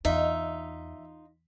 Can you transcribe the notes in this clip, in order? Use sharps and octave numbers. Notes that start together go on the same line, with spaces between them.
E2 D#4 F4 E5